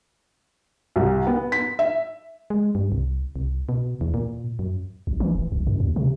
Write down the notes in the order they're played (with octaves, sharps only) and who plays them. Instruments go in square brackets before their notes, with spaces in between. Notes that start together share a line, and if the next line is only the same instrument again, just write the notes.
[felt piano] C2
B3
B6
E5
[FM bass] G#3
G2
C2
C2
B2
E2
A#2
F#2
[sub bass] A#1
E3
D#1
B1
F#2
D#2
C3